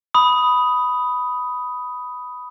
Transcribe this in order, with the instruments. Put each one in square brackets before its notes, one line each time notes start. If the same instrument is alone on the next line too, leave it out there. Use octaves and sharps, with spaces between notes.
[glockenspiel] B5 D#6